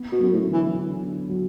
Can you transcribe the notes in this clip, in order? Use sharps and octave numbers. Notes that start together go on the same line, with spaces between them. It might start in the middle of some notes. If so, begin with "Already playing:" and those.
Already playing: B3
B2
F#2 F#3
A2
D3
E3
D3
B3
F#3